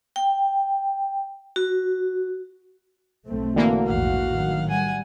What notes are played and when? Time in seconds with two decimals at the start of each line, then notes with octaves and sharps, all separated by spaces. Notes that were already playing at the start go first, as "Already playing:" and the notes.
0.16 G5
1.56 F#4
3.26 B1 A3 C4
3.56 D3 E3 A#3 F#4
3.87 A#1 E2 G#2 F5 F#5
4.32 A2 D#3 F#3
4.68 G3 F#5 G#5